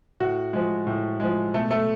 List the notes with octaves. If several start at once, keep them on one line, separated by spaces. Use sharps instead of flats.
A2 F#4
F3 G#3
A2
F3 G#3
B2 A3 A4
A3 A4